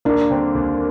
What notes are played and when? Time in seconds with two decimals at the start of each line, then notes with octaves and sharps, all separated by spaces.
0.05 D#2 A#3 D4
0.30 D3 G3 C4 G4
0.55 D#2